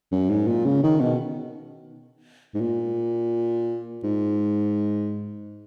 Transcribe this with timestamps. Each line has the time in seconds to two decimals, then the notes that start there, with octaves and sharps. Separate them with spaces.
0.11 F#2
0.29 G#2
0.47 A#2
0.65 C#3
0.83 D#3
1.00 B2
2.54 G#2
2.61 A#2
4.04 G#2